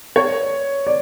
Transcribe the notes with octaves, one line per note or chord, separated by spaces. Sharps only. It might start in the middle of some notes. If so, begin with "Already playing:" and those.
C#5
D5